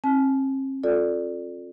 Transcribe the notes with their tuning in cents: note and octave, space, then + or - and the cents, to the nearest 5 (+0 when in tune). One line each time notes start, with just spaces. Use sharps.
C4 +45 A5 -40
F4 +25 A4 +0 D5 +0